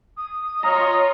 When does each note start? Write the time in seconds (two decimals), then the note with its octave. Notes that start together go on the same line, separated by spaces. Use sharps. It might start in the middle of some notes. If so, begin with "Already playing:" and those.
0.17 D#6
0.63 F4 C#5 D#5 F5 A#5